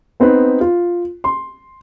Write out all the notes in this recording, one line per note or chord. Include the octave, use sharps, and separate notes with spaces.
B3 C4 D#4 B4
F4
C6